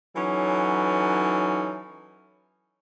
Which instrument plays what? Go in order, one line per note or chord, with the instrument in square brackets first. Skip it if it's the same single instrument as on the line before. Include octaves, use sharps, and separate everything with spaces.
[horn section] E3 F#3 C#4 D#4 A4